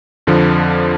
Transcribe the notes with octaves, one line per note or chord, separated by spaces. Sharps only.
F2 D3 F3